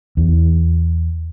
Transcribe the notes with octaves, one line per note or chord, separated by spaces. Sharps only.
E2